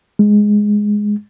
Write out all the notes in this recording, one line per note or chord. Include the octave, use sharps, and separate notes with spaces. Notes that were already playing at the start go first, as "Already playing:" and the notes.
G#3